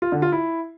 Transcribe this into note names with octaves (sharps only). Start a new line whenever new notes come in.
F4
D3
F4
E4